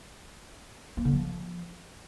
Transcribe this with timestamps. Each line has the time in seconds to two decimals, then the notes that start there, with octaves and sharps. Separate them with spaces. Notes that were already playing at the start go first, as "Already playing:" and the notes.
0.97 A#3
1.05 D3
1.13 F3